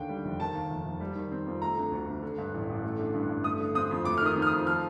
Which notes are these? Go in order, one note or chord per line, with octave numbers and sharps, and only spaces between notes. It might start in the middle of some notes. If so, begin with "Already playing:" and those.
Already playing: D#2 D3 G5
G3
F1
D#3 A5
D#2
F1
F1
G3
D#3
C4
F2
A3 A#5
D3
D2
D2
D3
G2
A1
A1
A3
D3
G2
G2
A3 D#6
D3
C4 D#6
F2
A3 D6
F6
D#3 D#6
C4
F6
D#6
F2
F3 F6